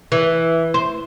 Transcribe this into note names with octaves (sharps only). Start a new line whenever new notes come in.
E3
C5